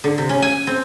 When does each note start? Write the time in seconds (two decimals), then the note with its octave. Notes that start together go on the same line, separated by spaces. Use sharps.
0.04 D3
0.18 C3
0.29 C#4
0.42 G#5
0.67 C4